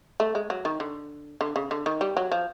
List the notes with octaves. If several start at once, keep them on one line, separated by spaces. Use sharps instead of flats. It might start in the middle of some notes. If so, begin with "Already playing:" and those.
A3
G#3
F#3
D#3
D3
D3
C#3
D3
D#3
G3
F#3
F3